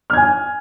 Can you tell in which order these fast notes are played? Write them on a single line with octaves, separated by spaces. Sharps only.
F6 G#6 G#5